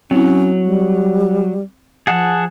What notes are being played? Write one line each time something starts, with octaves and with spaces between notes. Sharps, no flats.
F#3 C4 C#4 E4
G3
F3 G#4 F#5 A5